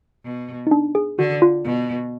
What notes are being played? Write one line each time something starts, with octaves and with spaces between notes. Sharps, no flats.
B2
D#4
D4
G#4
D3 F#4
F4
B2